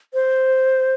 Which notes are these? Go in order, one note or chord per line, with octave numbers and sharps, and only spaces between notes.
C5